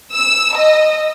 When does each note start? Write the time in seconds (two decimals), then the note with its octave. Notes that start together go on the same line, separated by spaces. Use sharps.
0.12 E6
0.54 D#5